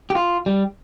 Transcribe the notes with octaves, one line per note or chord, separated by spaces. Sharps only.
G4
F4
G3